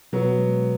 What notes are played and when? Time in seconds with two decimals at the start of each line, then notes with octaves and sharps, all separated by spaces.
0.13 B2 F#3 B3
0.39 G#3